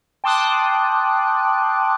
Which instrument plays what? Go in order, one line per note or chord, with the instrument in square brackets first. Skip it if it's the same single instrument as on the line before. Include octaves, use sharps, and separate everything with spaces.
[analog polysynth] G5 A5 C6 D6 D#6 F#6